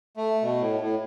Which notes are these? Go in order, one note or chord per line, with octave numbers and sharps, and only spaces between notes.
A3
B2
A2
A2